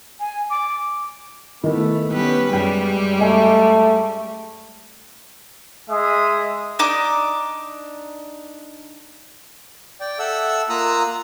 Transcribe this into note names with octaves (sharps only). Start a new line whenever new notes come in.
G#5
D6
D#3 A3 B3 E4
G3 B3 C#4 B4
F#2 G3 G#3 G5
A3 D#5 E5 G#5
G#3 E5 D#6
D4 D#4 D6
D5 G5
A4 E5 F#5 E6
A#3 F4 A#5 D#6 E6 F#6